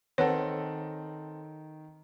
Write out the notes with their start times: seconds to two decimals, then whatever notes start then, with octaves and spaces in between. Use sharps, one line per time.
0.18 D#3 C4 A4 B4 C#5 F#5